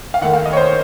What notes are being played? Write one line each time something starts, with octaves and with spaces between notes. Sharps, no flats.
F5
D#2 D#3 A3 F#5
F5
D#5
C#5
C5